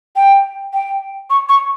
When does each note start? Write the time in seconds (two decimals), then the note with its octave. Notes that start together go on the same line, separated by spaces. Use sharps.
0.16 G5
0.74 G5
1.30 C#6
1.49 C#6